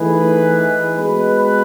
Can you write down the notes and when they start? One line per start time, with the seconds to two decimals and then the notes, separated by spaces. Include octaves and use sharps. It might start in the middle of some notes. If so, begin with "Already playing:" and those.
Already playing: E3 A3 D#4 G#4 B4
0.97 G#3 B3 F#4 B4